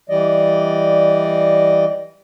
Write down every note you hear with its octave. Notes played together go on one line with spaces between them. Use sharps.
E3 G3 D5 D#5